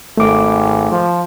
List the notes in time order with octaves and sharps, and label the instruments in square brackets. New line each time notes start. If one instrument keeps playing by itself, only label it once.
[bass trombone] G#1 [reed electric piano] A3 D6
[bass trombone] F3